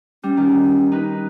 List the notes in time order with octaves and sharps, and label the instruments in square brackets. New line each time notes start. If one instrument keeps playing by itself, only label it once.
[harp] G3 [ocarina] C#4
[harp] D#3
D#4 B4